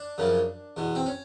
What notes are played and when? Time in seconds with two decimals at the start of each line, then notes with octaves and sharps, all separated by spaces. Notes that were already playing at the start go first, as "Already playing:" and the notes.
Already playing: D4
0.18 F#2 C#3 F3
0.77 E2 B2
0.95 C4
1.06 C#4